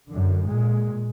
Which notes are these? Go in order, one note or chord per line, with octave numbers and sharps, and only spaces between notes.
F#2 D3
A#2 G#3